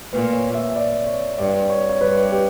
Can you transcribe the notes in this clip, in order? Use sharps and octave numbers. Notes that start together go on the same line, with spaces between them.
A#2 B4
C#5
E5
D5
C#5
G2 D5
C#5
C#5
G2 B4
G4